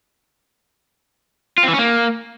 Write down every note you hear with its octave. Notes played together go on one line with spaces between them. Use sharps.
F4
C4
E3
C#4
A#3